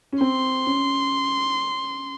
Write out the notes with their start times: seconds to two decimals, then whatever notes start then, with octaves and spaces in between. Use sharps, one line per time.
0.13 C#4
0.21 C4 C6
0.66 C#4